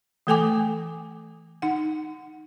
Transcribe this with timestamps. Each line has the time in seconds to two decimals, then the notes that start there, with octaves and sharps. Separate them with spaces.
0.27 E3 A3 A4 G5 G#5 D6
1.62 D#4 F#5